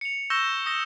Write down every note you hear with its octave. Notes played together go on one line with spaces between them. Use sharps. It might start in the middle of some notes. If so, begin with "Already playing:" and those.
C#7 F7
C#6 E6 G6 A#6 E7 G7
D#6 A#6 E7 G7